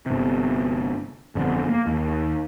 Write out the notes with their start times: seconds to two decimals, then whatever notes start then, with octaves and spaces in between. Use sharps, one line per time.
0.06 G1 C3
1.35 G1 F2 G#2 D3
1.69 A#3
1.87 D#2